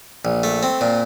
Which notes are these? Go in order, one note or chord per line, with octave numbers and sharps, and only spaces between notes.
A#1
A3
C4
A#2